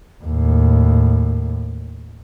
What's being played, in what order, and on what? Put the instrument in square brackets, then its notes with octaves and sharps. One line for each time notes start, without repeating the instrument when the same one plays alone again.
[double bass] D#2 A2